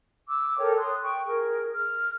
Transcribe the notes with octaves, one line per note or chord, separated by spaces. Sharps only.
D6 E6
A4 A#4 C#5 G5
C6 D#6 F#6
G5 C#6
G#4 A#4
F6